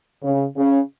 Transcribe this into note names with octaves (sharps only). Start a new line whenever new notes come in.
C#3
C#3